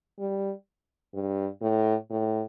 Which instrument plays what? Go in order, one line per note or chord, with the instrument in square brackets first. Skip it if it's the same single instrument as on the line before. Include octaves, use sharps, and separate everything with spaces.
[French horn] G3
G2
A2
A2